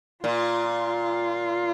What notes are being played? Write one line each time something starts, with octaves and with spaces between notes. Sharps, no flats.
A#2 F4